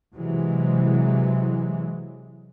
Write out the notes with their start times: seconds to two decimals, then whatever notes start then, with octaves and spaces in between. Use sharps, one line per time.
0.16 C3 E3 F#3 G#3